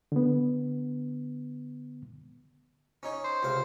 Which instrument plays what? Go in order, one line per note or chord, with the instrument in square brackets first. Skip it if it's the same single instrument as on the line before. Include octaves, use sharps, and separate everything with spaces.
[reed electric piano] D3 B3
[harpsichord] C#4 D#4 C#5
[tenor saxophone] C5
[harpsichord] C#2 C3 F5